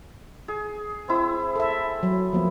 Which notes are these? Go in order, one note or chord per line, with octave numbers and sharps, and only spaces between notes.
G#4
C4 E4 E6
A4 E5
F#3
F3 A#3 B3